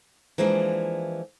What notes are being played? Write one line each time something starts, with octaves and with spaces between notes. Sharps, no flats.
E3 F3 G#3 A#3 D4